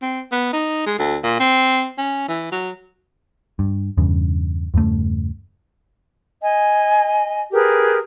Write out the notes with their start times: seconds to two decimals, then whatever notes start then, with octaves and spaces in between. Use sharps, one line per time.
0.02 C4
0.31 B3
0.53 D#4
0.86 G#3
0.98 D2
1.23 A#2
1.40 C4
1.97 C#4
2.28 E3
2.52 F#3
3.59 G2
3.98 E2 G2 C#3
4.74 E2 G2 C#3 A3
6.42 D#5 G#5
7.53 G4 G#4 A#4 B4